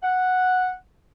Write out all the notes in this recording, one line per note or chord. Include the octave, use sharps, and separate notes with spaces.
F#5